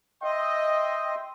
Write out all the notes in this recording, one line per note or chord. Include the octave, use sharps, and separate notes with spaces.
D#5 E5 G5 C6